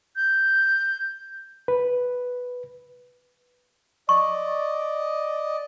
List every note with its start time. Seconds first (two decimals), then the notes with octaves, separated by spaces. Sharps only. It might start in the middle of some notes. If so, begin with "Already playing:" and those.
0.16 G6
1.68 B4
4.09 D5 D#5 C#6